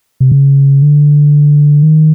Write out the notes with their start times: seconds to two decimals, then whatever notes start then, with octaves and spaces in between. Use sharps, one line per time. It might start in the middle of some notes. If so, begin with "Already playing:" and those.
0.20 C3
0.32 C#3
0.82 D3
1.83 D#3